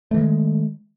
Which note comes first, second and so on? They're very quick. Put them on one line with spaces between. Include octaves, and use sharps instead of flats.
A3 E3 D#3 G#3